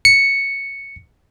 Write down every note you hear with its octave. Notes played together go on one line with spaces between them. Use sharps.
C#7